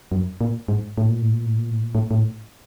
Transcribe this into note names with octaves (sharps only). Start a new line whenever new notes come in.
F#2
A#2
G#2
A2
A#2
A2
A#2
A2
A#2
A2
A#2
A2
A2